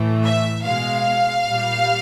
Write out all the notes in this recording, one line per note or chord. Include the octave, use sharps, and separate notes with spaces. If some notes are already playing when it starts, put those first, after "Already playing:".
Already playing: A2 E3 A3
E5
B2 G#3 F5
A#2 G3